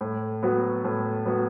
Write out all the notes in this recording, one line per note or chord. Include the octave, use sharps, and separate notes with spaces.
A2
F#3 B3 F#4
A2
F#3 B3 F#4